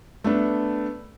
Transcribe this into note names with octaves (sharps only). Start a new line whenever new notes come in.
A3 B3 D4